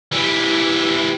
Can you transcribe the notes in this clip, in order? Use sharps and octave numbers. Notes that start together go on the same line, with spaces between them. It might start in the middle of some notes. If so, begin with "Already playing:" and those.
E3 G3